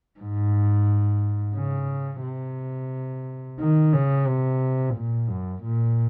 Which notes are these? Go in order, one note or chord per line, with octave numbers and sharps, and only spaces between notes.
G#2
C#3
C3
D#3
C#3
C3
A#2
F#2
A#2